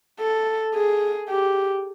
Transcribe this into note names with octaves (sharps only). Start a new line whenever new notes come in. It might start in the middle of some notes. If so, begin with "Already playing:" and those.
A4
G#4
G4